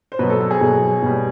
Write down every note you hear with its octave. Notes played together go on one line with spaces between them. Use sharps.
C5
B2 F#3 B4
A4
A4
G#4
B2 F#3
B2 G3